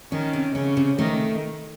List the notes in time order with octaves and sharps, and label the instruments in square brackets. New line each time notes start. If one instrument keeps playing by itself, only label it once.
[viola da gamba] D#3 [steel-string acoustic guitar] C#4
[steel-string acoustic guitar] C3
[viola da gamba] C#3 [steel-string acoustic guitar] C#4
[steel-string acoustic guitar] C3
[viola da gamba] D#3 [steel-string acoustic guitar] A3